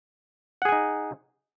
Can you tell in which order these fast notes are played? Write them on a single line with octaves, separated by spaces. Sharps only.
F#5 G#4 G#5 D#4